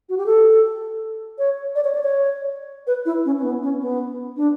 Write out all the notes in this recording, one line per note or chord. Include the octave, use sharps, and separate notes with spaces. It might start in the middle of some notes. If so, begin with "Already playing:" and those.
F#4
G4
A4
C#5
D5
C#5
D5
C#5
B4
E4
C#4
C#4
B3
C#4
B3
D4